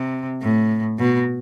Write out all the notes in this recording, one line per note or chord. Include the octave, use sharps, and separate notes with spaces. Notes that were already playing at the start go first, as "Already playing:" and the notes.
Already playing: C3
A2
B2